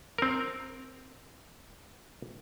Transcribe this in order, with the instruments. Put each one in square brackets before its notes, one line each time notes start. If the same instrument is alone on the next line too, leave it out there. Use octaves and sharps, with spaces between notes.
[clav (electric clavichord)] C4 A#4